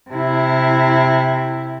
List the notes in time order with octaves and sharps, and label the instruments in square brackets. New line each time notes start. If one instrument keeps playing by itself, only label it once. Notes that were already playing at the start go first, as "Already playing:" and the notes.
[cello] C3 E4